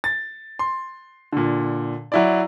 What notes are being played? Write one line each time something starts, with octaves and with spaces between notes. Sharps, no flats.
A6
C6
A#2 D3
F#3 E4 D5